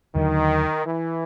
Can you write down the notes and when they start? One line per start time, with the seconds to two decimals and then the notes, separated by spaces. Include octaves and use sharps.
0.15 D#2 D3 D#3 F#3
0.86 E3